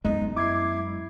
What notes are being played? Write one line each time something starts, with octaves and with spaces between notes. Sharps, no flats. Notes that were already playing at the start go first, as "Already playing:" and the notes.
F#2 G#3 A3 B3 D#4
E4 D6 G#6 C7